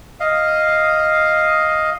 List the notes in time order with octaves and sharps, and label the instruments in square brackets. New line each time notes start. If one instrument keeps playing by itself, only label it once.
[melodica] D#5 F5